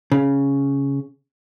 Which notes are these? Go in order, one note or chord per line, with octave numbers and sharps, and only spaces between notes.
C#3